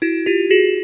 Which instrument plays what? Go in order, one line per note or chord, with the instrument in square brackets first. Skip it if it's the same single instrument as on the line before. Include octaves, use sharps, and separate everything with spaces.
[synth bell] E4 F#4
F4 G4
F#4 G#4